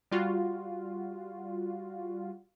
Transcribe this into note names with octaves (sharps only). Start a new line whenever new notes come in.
G3 F4 F#4